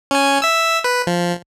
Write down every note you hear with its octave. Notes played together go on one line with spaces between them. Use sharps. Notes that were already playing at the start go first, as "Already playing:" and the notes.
C#4 G#5
E5 E6
B4
F3